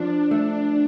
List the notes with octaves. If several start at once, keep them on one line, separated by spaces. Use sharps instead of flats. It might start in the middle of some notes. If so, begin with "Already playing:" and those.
Already playing: F3 D4
A3